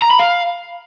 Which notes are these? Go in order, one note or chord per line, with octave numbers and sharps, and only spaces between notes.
A#5
B5
F5